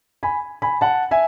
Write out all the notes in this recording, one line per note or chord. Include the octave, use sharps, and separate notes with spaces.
G#5 B5
G#5 B5
F#5 A5
E5 G#5